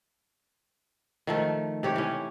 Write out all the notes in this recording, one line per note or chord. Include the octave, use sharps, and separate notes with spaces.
D#3 F3 A3
C3 G4 C#5
E3 C#4